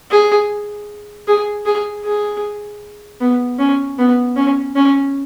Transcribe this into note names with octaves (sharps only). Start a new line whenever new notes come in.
G#4
G#4
G#4
G#4
B3
C#4
B3
C#4
C#4